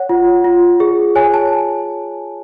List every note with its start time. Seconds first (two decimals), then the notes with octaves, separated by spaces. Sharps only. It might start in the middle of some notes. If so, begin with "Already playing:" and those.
Already playing: C#5 F#5
0.09 F4
0.44 F4
0.80 G#4
1.15 C#5 G#5
1.34 A5